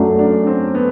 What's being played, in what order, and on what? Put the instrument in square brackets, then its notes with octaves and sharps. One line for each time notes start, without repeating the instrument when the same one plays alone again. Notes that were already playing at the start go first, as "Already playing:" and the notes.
Already playing: [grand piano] F#2 F#3 A3 [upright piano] D4
[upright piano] D4
C4
B3